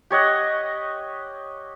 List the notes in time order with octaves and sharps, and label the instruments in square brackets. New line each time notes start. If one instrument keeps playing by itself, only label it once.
[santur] G4 C#5 D#5 F#5